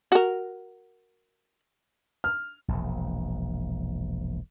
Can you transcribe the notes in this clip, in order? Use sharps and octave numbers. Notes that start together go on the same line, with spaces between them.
F#4 A#4
F6
E1 A#1